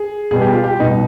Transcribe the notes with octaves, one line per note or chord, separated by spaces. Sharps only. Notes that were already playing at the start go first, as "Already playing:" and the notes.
Already playing: G#4
B2 G3 B3 G#4
G4
F4
G4
C2 B2 B3 D#4